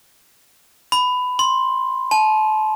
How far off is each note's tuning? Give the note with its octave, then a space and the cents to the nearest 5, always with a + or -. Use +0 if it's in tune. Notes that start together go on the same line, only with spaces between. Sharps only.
B5 +15
C6 +10
A5 -30